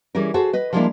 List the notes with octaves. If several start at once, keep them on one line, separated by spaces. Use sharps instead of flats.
E3 G3 C#4 G#4 A#4
F#4 G#4 A4 C5
B4 D#5
F3 G3 G#3 A#3 D4 E4